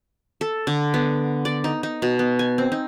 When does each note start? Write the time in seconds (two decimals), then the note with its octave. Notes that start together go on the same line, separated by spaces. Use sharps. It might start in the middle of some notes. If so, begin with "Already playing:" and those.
0.41 A4
0.67 D3
0.94 B3
1.45 D5
1.64 D#4
1.83 D#4
2.02 B2
2.19 B3
2.39 G#5
2.58 C4
2.72 D#4